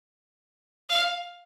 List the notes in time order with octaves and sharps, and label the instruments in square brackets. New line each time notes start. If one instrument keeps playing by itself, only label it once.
[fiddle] F5